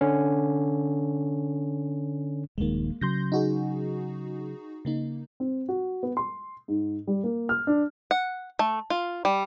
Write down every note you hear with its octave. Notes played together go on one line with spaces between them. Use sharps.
D3 C#4
D#1 A#1 D#3 G#3 A#3
C#3 F#3 C6 G6 A#6
D#4 F#4 G#4
C#3 A#3 D#4
C4
F#4
B3
C6
G#2
G3
A#3
F6
D4
F#5
A3
F4
G3